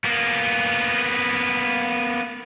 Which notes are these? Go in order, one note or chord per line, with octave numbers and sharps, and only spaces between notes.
A#3 B3